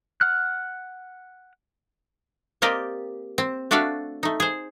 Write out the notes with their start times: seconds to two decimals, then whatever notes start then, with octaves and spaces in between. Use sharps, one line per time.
0.21 F#5 F6 F#6
2.62 A#3 C4 G4 A#4 D5 D#5
3.38 C4
3.71 A3 D4 F#4 D5 E5 F5
4.23 A3 D#4
4.40 G#4 C5